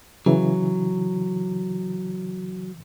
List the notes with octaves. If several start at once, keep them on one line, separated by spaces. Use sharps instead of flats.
C#3 E3 F#3